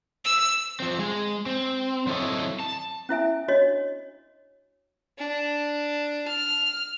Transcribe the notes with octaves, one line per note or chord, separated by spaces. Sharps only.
E6
F3 C4
G#3
C4
F#3 C4 E4 A4 C#5 D#5
A5
C#4 E4 E5 G#5
D4 F#4 C#5 D#5
D4
F6